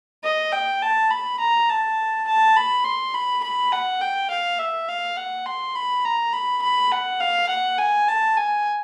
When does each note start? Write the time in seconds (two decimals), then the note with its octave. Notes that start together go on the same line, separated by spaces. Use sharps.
0.24 D#5
0.52 G5
0.82 A5
1.10 B5
1.39 A#5
1.69 A5
2.27 A5
2.56 B5
2.84 C6
3.14 B5
3.44 B5
3.72 F#5
4.01 G5
4.30 F5
4.59 E5
4.88 F5
5.17 F#5
5.46 C6
5.75 B5
6.05 A#5
6.33 B5
6.62 B5
6.92 F#5
7.20 F5
7.49 F#5
7.78 G#5
8.08 A5
8.37 G#5